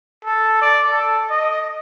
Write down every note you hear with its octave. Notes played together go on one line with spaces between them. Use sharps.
A4
D5
A4
D#5